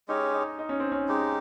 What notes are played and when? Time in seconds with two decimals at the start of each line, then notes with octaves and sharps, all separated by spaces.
0.08 G#3 C#4 D#4 G4 C#5
0.34 D#4
0.59 D#4
0.69 C#4
0.80 C4
0.92 C#4
1.08 G#3 D#4 G4